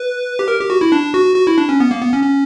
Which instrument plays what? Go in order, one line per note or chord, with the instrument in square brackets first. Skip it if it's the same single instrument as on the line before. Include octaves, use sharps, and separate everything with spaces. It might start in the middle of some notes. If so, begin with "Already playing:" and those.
Already playing: [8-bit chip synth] B4
G4
A#4
G4
F#4
E4
D4
F#4
F#4
E4
D4
C#4
B3
A#3
B3
C#4
C#4